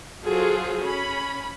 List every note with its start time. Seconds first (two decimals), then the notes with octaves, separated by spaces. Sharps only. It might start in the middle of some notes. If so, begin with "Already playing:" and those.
0.24 F#3 F4 G#4 A4 C5
0.83 C#4 B5